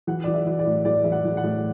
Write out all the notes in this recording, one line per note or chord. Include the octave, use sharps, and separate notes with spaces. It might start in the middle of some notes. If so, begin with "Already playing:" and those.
E3 F#5
E3 D5
E5
E3
D5
A2
E3 D5
E3 E5
F#5
E3
F#5
A2